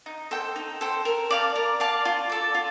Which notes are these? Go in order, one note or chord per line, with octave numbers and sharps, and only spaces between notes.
D#4
A4 C5 G5
D#4
A4 C5 G5
A#4
D5 F5 A5
A#4
D5 F5 A5
F4
A4 D5
F4